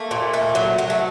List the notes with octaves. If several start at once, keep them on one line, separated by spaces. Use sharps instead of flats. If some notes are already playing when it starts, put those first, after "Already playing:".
Already playing: A3 A#3
A#2
A3
F#3
F#3
A3